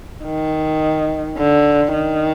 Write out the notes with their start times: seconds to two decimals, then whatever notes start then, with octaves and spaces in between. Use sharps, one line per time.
0.24 D#3
1.38 D3
1.93 D#3